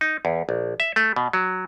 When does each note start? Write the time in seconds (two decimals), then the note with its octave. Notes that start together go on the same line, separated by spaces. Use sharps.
0.01 D#4
0.25 E2
0.49 A#1
0.80 E5
0.96 A3
1.16 B2
1.33 F#3